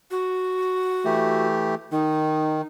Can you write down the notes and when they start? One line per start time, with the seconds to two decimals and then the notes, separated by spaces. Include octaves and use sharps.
0.11 F#4
1.05 E3 A3 G4
1.92 D#3 D#4